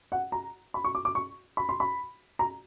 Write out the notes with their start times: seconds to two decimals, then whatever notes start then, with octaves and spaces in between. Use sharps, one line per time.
0.12 F#5
0.32 A#5
0.74 B5
0.84 C#6
0.95 D6
1.05 D6
1.15 C#6
1.57 B5
1.69 C6
1.80 B5
2.39 A#5